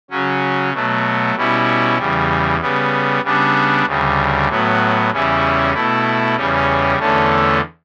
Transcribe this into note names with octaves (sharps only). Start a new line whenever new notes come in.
C#3 F#3 C#4
B2 F#3 A3
B2 G3 C#4 E4
E2 C#3 G3
C#3 G3 B3
C#3 G3 B3 D4
D2 C#3 G3
A2 F#3 B3
E2 C#3 G3 C#4 E4
B2 A3 E4
E2 C#3 G3 C#4
E2 D3 A3 C#4